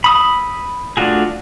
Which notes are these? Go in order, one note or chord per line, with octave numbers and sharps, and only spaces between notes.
B5 D#6 E6
A3 D4 F4 F#4 G#4